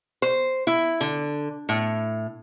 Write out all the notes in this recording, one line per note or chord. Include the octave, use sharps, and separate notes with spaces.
C5
E4
D3
A2